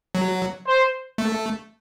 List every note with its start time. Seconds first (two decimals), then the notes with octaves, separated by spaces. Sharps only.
0.15 F#3
0.66 C5
1.18 A3